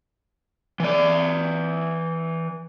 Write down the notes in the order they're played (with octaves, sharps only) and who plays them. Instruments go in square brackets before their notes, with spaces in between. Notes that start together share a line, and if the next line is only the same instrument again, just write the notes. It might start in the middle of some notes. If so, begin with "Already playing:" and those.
[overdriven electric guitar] E3 D5